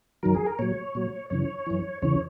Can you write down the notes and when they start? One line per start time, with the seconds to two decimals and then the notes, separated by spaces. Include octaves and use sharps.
0.23 F#2 D#3 F#3 A#4
0.34 G#4
0.46 A#4
0.59 A#2 F#3 C#5
0.95 A#2 F#3
1.30 F#2 C#3 E3 C#5
1.66 F#2 E3
2.02 E2 C#3 E3 C#5